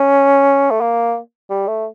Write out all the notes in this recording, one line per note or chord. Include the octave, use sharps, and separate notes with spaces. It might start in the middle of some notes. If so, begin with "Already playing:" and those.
Already playing: C#4
A3
A#3
G3
A3